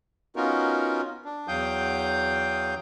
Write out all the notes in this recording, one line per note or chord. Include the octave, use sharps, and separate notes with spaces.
B3 C#4 D#4 F4 F#4 A#4
D4
E2 F#3 F5 G5 D#6 G6